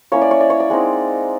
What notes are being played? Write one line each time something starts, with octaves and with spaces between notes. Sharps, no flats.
A#3 C#4 E4 C#5
D5
C#5
D5
C#5
D5
G#3 C4 D#4